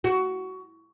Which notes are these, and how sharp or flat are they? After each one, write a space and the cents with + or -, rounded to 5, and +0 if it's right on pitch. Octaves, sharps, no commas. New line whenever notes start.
F#4 +15